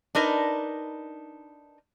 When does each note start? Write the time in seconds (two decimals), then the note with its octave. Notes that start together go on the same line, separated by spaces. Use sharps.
0.15 D4 D#4 A#4 B4